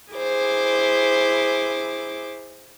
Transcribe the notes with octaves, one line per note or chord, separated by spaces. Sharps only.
E4 G#4 C5 D6